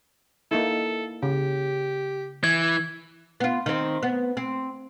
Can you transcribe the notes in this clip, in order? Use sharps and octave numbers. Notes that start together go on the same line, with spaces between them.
A#3 D#4 E4 A4
C#3 G4
E3 G#6
B3 F4
D#3 C4
B3
C4